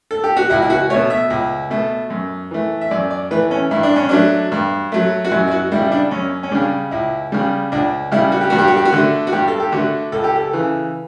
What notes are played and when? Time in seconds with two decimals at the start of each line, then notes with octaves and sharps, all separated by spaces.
0.11 A4
0.24 G4
0.37 F#4
0.50 C#2 E4
0.62 E4
0.70 F#4
0.90 A3 C#5
0.94 B2
1.10 E5
1.30 C#2
1.70 B2 A3
2.10 F#2
2.51 E3 A3
2.81 E5
2.91 F#2 D5
3.11 D5
3.31 E3 A3 B4
3.51 C#4
3.71 G2 E4
3.83 D4
3.96 C#4
4.09 F#3 A3 D4
4.52 G2
4.92 F#3 A3
5.25 F#4
5.31 F#2 E4
5.47 E4
5.51 F#4
5.72 C#3 G3 E4
5.85 E4
5.92 D4
6.11 F#2 C#4
6.43 C#4
6.52 C#3 G3 D4
6.91 C#2 E4
7.32 C#3 G3
7.72 C#2 D4
8.12 C#3 G3 E4
8.32 F#4
8.41 G4
8.50 G2 F#4
8.58 G4
8.68 F#4
8.77 G4
8.85 F#4
8.93 D3 A3
9.27 F#4
9.32 G2 G4
9.48 A4
9.60 G4
9.72 D3 A3 F#4
10.12 C#2 A4
10.24 G4
10.36 A4
10.53 C#3 E3